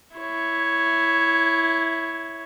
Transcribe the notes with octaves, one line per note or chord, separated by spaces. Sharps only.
E4 C#5